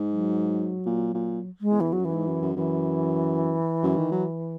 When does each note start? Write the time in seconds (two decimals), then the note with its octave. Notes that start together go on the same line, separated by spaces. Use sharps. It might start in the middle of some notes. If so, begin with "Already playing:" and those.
Already playing: G#2
0.11 F#3
0.86 A#2
1.14 A#2
1.61 G#3
1.71 E2
1.80 E3
1.93 F#3
2.00 F#2
2.05 E3
2.13 G#2
2.27 F#2
2.42 F#2
2.55 F#2 E3
3.83 F#2
3.97 D#3
4.12 F#3